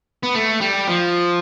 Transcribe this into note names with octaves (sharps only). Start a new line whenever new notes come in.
B3
A3
G3
F3